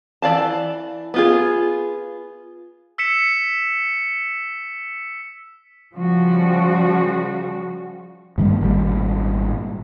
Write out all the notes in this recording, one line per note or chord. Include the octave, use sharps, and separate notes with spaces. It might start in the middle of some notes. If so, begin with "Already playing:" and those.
E3 D5 F5 A5
B3 F4 G#4
E6 B6 C#7 E7
C#3 F3 G3 F#4
G2 D#3 G3 A#3
G#1 A#2 C#3 G3